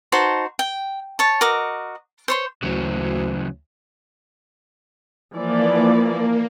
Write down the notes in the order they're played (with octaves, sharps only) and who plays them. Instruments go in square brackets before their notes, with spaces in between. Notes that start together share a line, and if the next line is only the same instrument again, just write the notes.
[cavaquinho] D#4 F#4 C5 A5
G5
C#5 A5
F#4 A#4 D#5 D6
C5 C#5 C6
[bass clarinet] D2 [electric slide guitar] C#3 E3 F#3
[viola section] E3 F3 D5 [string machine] A#3